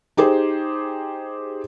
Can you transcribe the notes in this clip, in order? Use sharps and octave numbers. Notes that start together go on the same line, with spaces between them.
D#4 G4 G#4 C5